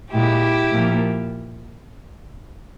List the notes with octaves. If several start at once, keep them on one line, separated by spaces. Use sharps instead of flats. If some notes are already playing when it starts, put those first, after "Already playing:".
A#2 G#3 E4 G4
A#2 F3 A#3